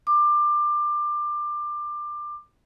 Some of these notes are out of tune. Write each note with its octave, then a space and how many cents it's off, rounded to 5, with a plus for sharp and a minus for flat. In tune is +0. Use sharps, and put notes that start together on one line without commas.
D6 +20